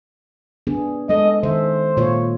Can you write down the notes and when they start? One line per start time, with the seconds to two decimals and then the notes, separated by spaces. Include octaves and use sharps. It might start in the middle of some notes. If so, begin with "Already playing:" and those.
0.67 B3 D4 G#4
1.09 G#3 A4 D#5
1.43 D#3 A4 C5 E5
1.97 A#2 F4 C#5